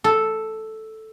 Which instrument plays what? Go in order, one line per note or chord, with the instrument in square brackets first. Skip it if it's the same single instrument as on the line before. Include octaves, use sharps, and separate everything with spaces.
[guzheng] A4